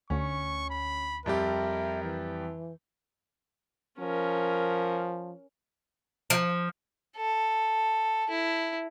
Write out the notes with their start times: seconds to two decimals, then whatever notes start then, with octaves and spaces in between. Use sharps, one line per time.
0.10 D2 C#4 C#6
0.70 B5
1.26 F2 G3 G4 A#4 E5
2.03 E3
3.99 F3 C#4 A#4
6.30 F3
7.16 A4
8.30 E4